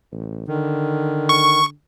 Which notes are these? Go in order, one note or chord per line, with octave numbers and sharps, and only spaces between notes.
A1
D3 D#3
C#6